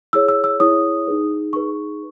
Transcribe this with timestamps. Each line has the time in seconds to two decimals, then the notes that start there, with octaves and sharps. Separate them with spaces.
0.13 E4 G#4 C#5 E6
0.28 E6
0.44 E6
0.59 E4 G#4 C#5 D#6
1.07 D#4 G#4 B4
1.53 D#4 G#4 B4 C#6